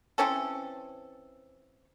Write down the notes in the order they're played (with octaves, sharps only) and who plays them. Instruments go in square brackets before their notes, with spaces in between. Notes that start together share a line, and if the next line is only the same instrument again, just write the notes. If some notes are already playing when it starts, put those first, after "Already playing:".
[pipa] E3 C4 C#4 A4